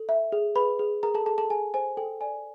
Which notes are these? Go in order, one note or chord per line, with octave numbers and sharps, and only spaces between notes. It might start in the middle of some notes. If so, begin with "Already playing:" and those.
Already playing: A4
E5
G#4
G#4 B4 B5
G#4
G#4 A#4 A#5
A4 A5
G#4 A4 A5
A4 A5
G#4 G#5
C5 G#5
A4 G5
D5 G#5